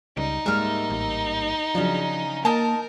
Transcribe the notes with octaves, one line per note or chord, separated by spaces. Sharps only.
C#2 G3 D#4
G#2 G3 G#3 A#3 E5 F6
A1
C#3 F3 F#3 D4
A#3 D#4 A#4 A5